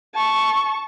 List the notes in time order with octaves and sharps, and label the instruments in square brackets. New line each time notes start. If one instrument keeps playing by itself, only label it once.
[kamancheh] A5 C#6